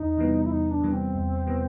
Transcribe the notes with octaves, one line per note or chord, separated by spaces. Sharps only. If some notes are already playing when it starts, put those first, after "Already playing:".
Already playing: E2 D#4
C3 E3 G3 B3
E4
E2 D#4
D4
C3 E3 G3 B3
C4
E2
C3 E3 G3 B3